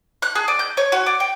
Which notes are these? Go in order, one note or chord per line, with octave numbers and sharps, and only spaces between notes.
F#6
G#4
D5
G6
C#5
F#4
D5
G5